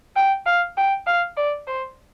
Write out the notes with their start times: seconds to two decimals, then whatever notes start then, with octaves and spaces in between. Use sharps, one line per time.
0.16 G5
0.46 F5
0.77 G5
1.07 F5
1.37 D5
1.67 C5